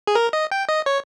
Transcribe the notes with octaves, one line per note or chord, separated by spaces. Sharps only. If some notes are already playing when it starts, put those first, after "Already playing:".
G#4
A#4
D#5
G5
D#5
C#5